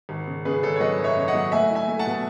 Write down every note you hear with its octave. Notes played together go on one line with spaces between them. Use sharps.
G#1
C#3
C#3 G#4 B4
G#1 A4 C#5
C#5
F#3 B4 D#5
F#2
C#5 E5
C#3
D#5 F#5
F#3
A3 E5 G#5
E4
E5 G#5
A3
F#5 A5
B2